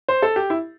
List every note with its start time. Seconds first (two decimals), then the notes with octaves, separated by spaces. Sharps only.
0.09 C5
0.22 A4
0.36 G4
0.50 E4